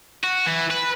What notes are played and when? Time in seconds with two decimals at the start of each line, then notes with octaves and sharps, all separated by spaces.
0.24 F#4
0.46 E3
0.70 B4